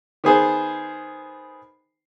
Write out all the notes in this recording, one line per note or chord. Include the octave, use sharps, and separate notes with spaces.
D#3 B3 G#4 C5